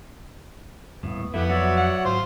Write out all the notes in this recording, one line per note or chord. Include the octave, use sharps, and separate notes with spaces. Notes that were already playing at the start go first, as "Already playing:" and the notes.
D#1 A2 B3
F2 A3 B3 E4 G4
F#3 F#4 C#5 D5 E5
F#5
G#1 F4 C5